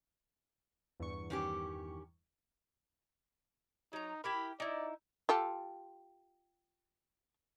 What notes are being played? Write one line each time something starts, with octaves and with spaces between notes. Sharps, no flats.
E2 G2 C#6
D#3 C#4 G4
F#3 D#4 A#5
E4 G4 A#4 B5
D#4 E4 D5
F4 G4 A4